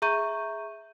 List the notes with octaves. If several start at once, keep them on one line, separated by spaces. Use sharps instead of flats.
G#4 E5 A#5 C#6 G6 D#7